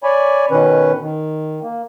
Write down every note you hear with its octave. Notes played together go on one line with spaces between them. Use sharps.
C#5 D5 G#5 B5
B2 D#3 C#4 B4
D#3
A#3